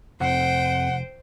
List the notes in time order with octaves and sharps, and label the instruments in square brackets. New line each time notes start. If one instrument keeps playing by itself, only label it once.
[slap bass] F1 [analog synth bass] F2 [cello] C5 G5 [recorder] F#5